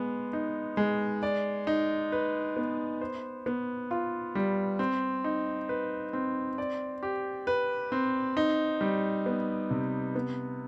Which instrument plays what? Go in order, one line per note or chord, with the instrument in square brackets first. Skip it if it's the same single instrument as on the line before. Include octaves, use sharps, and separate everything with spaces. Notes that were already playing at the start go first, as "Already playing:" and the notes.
Already playing: [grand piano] G#3 B3
D#4
G#3
D5
D#4
B4
B3
C5
B3
F4
G3
C4
D#4
B4
C4
D5
G4
B4
C4
D#4
G3
B3
C3
B3